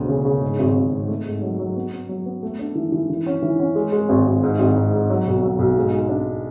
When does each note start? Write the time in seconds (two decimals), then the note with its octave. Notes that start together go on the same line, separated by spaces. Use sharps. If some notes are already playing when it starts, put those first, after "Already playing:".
Already playing: E1 D2
0.08 C#3
0.25 C#3
0.41 G#2
0.59 G#1
0.76 G#1
0.93 G#2
1.08 A3
1.26 G#2
1.42 F#3
1.59 F#3
1.76 B3
1.92 B3
2.09 F#3
2.26 B3
2.43 A3
2.59 D4
2.75 E3
2.92 E3
3.10 E3
3.26 C#4
3.42 E3
3.59 C#4
3.75 G#3
3.92 G#3
4.09 G#1
4.26 G#1
4.43 G#2
4.59 G#1
4.76 G#2
4.93 G#2
5.10 F#3
5.27 B1
5.43 F#3
5.59 B1
5.77 G#2
5.92 G#3
6.09 D4